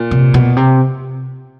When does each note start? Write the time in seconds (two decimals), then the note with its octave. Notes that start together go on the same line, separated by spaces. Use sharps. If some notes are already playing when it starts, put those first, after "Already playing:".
Already playing: A#2
0.11 C3
0.34 B2
0.57 C3